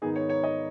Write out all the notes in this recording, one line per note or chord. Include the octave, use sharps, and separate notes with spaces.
G#2 D#3 B3 D#4 G#4
C#5
C#5
D#5